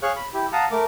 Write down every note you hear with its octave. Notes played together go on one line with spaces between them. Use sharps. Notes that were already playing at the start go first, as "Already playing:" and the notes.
G#4 C#5 F5 C#6 F#6
B5
E4 G4
F5 F#5 A5 A#5 D#6
A3 A#4 D6